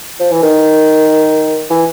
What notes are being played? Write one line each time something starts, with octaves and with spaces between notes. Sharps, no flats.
F3
E3
D#3
E3